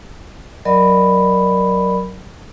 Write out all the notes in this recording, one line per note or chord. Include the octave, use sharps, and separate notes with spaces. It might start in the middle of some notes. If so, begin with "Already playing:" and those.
F#3 A#4 D5 D#5 B5